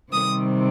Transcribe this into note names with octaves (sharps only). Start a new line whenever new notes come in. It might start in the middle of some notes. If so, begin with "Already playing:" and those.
C3 D#3 G3 C4 D#6